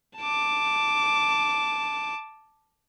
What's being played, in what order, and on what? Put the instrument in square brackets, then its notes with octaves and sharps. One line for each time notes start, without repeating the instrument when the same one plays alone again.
[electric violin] A5 D6